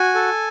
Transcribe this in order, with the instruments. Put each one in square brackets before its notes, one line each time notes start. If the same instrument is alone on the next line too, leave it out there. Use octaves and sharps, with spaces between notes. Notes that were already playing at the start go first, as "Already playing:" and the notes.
Already playing: [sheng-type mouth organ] F#4 G#5
A4